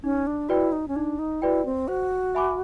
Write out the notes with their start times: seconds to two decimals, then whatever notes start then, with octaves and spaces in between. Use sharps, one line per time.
0.03 C#4 D#4
0.27 D4
0.49 E4 F#4 B4 D5 G5
0.72 D#4
0.88 C#4
0.96 D4 D#4
1.19 D#4
1.41 E4 F#4 B4 D5 G5
1.66 C4
1.88 F#4 C5
2.35 E5 G#5 B5 D6